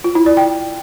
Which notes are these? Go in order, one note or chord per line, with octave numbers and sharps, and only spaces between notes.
F4
E4
D5
G5